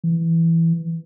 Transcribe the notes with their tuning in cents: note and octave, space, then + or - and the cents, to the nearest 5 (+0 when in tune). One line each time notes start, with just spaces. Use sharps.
E3 +5